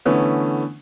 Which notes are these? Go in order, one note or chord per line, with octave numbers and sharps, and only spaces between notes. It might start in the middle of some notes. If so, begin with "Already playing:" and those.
D3 E3 A3 B3 C#4